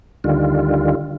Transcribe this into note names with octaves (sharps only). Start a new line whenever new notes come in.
D2 D3 D#3 G3 F4